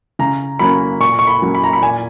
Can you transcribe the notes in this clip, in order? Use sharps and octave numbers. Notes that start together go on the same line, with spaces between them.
C#3 A#5
F#3 A#3 C#4 B5
A#2 C#6
C#6
B5
F#3 A#3 C#4
B5
A#5
B5
A#2 G#5